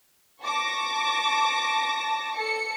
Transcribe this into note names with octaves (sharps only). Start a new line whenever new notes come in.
A5 C#6 D6 A#6
A4 C#7